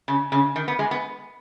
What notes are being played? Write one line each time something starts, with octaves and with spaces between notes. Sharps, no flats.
C#3
C#3
D#3
B3
G#3
B3